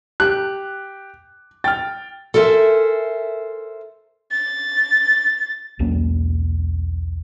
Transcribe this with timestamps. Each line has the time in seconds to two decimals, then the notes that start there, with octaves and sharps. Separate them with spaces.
0.20 G4 F#6
1.64 G5 F6 A6
2.34 A4 A#4 C5 C#5 E5 G#5
4.31 A6
5.79 B1 E2 A#3 C#4